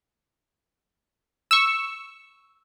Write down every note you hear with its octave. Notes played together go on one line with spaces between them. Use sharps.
C#6 E6